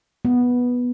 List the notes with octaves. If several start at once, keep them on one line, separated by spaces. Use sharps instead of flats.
B3